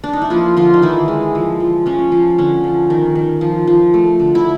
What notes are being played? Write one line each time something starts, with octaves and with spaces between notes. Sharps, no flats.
D4
D#4
E4
F3 A#3 F4
D3 F3 F4
D#4
D#3 E3 E4
G#3
F3
F3
F3 C#4
F3
D3 C#4
F3
D#3
D#3
F3
F3
A3
D3
E4